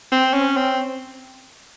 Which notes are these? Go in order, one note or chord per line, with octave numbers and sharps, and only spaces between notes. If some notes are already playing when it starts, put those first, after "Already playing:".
C4
C#4
C4